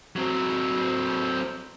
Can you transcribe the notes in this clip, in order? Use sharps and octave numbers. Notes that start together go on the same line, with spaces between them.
F#3 C4